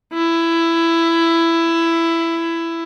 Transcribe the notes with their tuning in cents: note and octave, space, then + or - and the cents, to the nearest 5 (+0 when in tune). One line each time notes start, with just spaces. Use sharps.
E4 +15